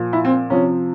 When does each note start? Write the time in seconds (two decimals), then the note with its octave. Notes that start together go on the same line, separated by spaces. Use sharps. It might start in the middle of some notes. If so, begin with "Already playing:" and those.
Already playing: A#2 F3
0.13 E4
0.25 C4
0.50 C3 F3 C#4